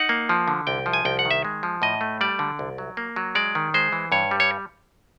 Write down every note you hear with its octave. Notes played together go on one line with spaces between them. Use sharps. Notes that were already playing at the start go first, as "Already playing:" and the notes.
Already playing: D#4 F#5
A#3
F3
D3
C2 G5
F3
G#5
C2 G5
F#5
D#3
E5
G#3
F3
A2 D#5
A3
G3 D5
D3
C2
F#3
A#3
F#3
G#3 D5
D#3
G#3 C5
E3
G2 C#5
G3
C#5